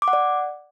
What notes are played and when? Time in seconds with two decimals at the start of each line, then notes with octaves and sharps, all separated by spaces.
0.02 D6
0.08 F#5
0.13 D5